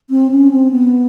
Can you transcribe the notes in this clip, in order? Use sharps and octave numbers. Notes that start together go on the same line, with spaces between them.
C4
C#4
C4
B3